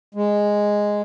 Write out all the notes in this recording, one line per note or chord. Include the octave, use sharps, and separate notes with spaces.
G#3